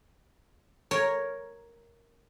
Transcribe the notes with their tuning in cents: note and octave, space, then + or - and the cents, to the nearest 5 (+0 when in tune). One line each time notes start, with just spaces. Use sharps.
A#4 +0 C#5 +0